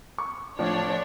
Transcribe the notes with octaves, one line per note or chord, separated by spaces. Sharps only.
C#6
A2 F3 D4 C#5 D5